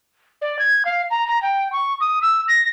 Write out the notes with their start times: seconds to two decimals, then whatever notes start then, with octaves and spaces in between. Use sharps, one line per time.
0.42 D5
0.59 G#6
0.85 F5
1.11 A#5
1.28 A#5
1.42 G5
1.72 C#6
2.01 D#6
2.22 E6
2.48 A#6